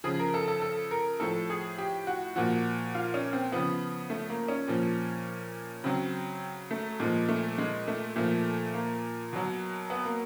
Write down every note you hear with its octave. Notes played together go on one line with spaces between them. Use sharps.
C#3 F3 G#4
A#4
A4
A4
A4
A#4
A2 F3 A4
G#4
G4
F#4
A#2 F3 F#4
F4
C#4
C4
C#3 F3 B3
A3
A#3
C#4
A#2 F3
C#3 F#3 C4
A3
A#2 F3 G#3
A3
G#3
A3
A#2 F3 A3
A#3
B2 F#3
B3
A#3